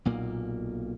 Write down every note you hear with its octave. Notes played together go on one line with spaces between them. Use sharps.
B1 A#2 A#3